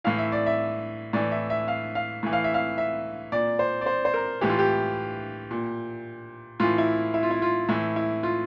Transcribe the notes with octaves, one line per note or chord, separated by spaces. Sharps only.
A2 E3 F5
E5
D5
E5
A2 E3 D5
E5
E5
F5
F5
A2 E3
F5
E5
F5
E5
A#2 D5
C5
D5
C5
C5
A#4
A2 E3 G4
F4
G4
A#2
A2 E3 F4
E4
E4
F4
E4
F4
A2 E3 E4
E4
F4